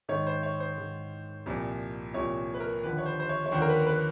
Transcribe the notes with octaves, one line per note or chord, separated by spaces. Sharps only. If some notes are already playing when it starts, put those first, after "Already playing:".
G#2 D#3 C#5
C5
C#5
C5
G#2 D#3
C2 A#2 F3
C2 A#2 F3 C#5
B4
A#4
D#2 D3 F3 B4
C#5
C5
C5
C#5
C#5
D#2 D3 F3 C5
A#4
B4
B4